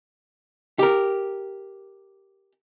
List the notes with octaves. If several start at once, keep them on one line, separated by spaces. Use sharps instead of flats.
G4 A#4